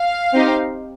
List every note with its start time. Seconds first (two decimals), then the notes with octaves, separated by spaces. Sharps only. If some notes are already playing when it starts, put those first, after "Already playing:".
Already playing: F5
0.33 C4 D#4 G4